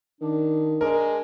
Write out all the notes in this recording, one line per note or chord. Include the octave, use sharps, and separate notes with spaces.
D#3 D4
G#3 D4 A#4